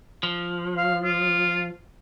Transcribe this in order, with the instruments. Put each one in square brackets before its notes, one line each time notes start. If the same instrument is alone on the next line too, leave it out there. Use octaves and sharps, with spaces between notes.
[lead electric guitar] F3
[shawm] F5
F4